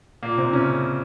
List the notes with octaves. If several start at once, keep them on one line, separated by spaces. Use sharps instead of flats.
A#2 A#3
C3 C4
C#3 C#4